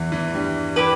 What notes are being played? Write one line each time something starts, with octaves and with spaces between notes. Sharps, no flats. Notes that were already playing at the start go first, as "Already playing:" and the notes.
Already playing: E2 E3
E2 E3
G2 G3
E3 E4 G4 B4